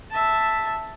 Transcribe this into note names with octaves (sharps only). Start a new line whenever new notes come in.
E5 A5